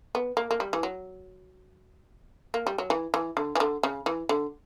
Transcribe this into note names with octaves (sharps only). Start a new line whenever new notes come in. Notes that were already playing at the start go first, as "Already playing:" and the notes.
B3
A#3
A#3
G3
E3
F#3
A#3
G3
F#3
E3
E3
D3
E3
D3
C#3
E3
D3